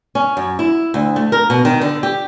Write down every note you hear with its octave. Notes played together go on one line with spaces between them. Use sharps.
C#4
F#2
E4
D2
A3
A#4
B2
D#3
D3
G4